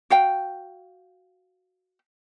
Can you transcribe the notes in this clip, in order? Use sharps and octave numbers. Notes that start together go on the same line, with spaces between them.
F#4 F5 G5